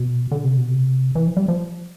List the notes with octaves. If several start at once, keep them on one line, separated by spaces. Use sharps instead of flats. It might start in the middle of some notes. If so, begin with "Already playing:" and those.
Already playing: B2
D3
C3
B2
C3
E3
F3
G3
F3